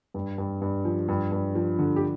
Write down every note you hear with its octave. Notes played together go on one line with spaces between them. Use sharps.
G2
G2
G2
F3
G2
G2
F3
D3
G4